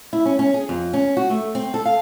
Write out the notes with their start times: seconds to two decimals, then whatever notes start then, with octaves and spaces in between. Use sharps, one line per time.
0.13 E4
0.26 C#4
0.39 C#4
0.54 G#4
0.69 F2
0.93 C#4
1.17 F#4
1.30 A3
1.55 C4
1.74 A4
1.85 F5